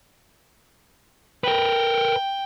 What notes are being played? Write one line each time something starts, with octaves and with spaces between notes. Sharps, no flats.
A#4 B4 G5